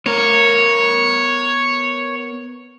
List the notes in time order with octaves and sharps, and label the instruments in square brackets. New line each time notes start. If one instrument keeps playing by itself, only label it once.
[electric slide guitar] B3 A#4 [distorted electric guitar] C#5